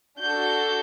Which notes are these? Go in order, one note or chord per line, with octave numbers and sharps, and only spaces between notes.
D4 F#4 A4 G6